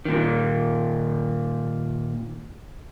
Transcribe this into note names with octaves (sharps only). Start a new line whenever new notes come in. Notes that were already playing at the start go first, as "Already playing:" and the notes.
A#2 D#3